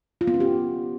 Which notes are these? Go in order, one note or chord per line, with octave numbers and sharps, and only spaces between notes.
F4
B3
C#4
G4